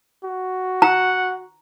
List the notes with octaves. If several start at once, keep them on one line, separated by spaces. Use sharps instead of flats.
F#4
F#5 A#5